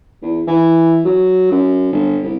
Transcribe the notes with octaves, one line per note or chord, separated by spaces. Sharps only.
E2
E3
F#3
F#2
G1
C2